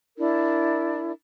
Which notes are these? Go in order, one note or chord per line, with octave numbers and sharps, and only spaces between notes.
D4 E4 A#4